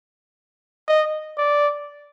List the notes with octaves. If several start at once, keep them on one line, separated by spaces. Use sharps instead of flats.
D#5
D5